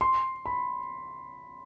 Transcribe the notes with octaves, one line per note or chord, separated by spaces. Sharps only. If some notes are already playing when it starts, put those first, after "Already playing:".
C6
B5